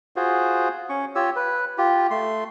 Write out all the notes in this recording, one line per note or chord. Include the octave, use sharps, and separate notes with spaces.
F4 F#4 G#4 C5
C#4 C#6
F4 G4 C#5 E6
B4
F4 G4
A3 C6